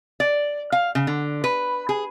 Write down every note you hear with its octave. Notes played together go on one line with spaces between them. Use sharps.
D5
F5
C#3
D3
B4
G#4